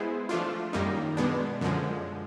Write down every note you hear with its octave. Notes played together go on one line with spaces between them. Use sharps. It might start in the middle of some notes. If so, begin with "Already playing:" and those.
Already playing: G#3 B3 E4 G#4 C5
F3 A3 D4 F4
F#2 D#3 G3 A#3 D#4
B2 G#3 B3 D4
F#2 D3 F3 G#3